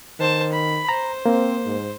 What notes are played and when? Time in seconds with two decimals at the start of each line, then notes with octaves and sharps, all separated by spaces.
0.20 D#3 C5 A5
0.52 B5
0.89 C5 A#5
1.26 A#3 C4
1.65 G#2